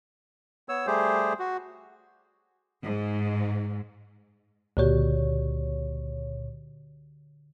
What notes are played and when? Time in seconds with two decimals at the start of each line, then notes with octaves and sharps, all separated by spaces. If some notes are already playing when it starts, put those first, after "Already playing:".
0.69 B3 C#5 E6
0.87 G3 A3 G4 G#4 C5
1.39 F#4
2.83 G#2
4.77 C#2 A#2 D3 F#4 G4 C#5